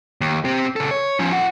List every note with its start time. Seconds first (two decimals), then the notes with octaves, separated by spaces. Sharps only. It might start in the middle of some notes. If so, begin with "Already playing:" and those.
0.21 D#2
0.45 C4 G4
0.76 C#3 A4
0.91 C#5
1.19 F3 C#4
1.32 F4 F#5